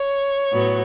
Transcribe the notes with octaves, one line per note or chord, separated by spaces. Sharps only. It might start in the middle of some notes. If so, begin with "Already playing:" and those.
Already playing: C#5
A2 F#3 B3